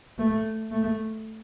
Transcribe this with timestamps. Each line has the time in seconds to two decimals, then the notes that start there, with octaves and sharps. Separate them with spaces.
0.19 A3
0.72 A3